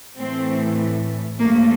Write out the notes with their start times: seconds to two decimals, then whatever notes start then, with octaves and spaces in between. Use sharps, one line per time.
0.18 A2 E3 A3 C4
1.39 G2 F3 A3 A#3